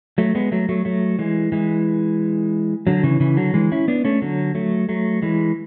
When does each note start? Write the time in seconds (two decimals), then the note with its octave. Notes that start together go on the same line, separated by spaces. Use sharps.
0.18 F#3 A3
0.35 G#3 B3
0.52 F#3 A3
0.69 F#3 A3
0.85 F#3 A3
1.19 E3 G#3
1.52 E3 G#3
2.87 D3 F#3
3.03 C#3 E3
3.20 C#3 E3
3.37 D3 F#3
3.54 E3 G#3
3.72 C#4 E4
3.88 B3 D4
4.05 A3 C#4
4.22 D3 F#3
4.55 F#3 A3
4.89 F#3 A3
5.22 E3 G#3